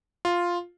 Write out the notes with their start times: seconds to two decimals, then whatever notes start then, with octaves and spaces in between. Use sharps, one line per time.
0.25 F4